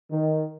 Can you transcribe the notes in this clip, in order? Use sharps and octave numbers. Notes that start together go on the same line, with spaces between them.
D#3